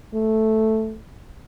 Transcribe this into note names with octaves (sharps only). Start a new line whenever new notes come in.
A3